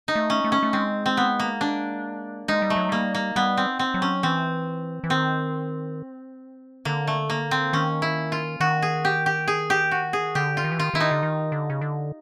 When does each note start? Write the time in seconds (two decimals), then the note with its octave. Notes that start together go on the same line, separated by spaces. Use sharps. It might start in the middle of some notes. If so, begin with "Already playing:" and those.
0.08 D#4
0.15 A3
0.30 C#4
0.44 A3
0.52 C#4
0.63 A3
0.73 G#3 C4
1.06 C4
1.17 B3
1.40 A#3
1.61 D4
2.48 G#3 D#4
2.62 G3
2.70 A3
2.76 F#3
2.89 G3 A#3
3.15 A#3
3.36 G3 B3
3.57 C4
3.79 C4
3.94 F#3
4.02 C#4
4.23 E3 C4
5.04 E3
5.10 D#3 C4
6.85 D3 A#3
7.07 A3
7.30 A#3
7.51 C4
7.73 D#3 C#4
8.02 E4
8.32 F4
8.60 D#3 F#4
8.82 G#4
9.05 G4
9.26 G4
9.48 G#4
9.70 G4
9.91 F#4
10.13 G#4
10.35 D3 G4
10.57 F4
10.64 D#3
10.72 E3
10.79 D#3 F4
10.94 D#3 E4
11.00 D#4
11.11 D3
11.23 D#3
11.52 D3
11.70 C#3
11.81 D3